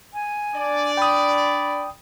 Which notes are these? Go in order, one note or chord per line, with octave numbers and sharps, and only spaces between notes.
G#5
D4 D5
G5 B5 D#6